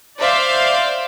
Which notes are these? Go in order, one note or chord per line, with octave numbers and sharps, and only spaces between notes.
C5 D5 E5 F5